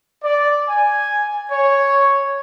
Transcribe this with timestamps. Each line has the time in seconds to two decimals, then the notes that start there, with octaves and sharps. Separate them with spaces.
0.23 D5
0.68 G#5
1.51 C#5